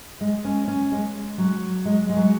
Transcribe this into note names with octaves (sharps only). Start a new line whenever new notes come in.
G#3
C#4
C#4
G#3
F#3
G#3
G#3
F#3